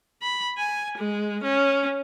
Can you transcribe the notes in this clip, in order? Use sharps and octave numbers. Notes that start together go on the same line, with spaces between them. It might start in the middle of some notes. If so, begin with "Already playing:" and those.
B5
G#5
G#3
C#4